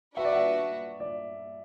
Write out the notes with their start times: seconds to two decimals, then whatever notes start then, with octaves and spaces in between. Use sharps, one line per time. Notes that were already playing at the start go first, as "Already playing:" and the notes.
0.16 D4 F#4 B4 E5
0.25 D5
0.33 E5
1.00 D5